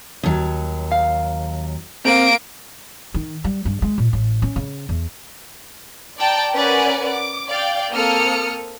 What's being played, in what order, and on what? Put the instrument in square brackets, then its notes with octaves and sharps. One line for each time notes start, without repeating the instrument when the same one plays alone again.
[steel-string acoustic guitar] D#2 F#3
[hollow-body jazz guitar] F5
[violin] A#3 D7 [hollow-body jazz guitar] C4
[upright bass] D#3
G3
G2
G#3
A#2
A1
C#4
C#3
E2
[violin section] D5 G5 A5 A#5
C#4 A#4 B4 D5 F#5 G#5
D6
D5 F5 G5
A#3 C4 A4 D#6 F6 C#7